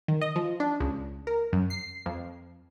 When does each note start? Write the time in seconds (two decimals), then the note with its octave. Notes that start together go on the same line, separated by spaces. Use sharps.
0.08 D#3
0.21 D#5
0.36 F3
0.60 D4
0.80 C#2
1.27 A#4
1.53 F#2
1.70 C7
2.06 F2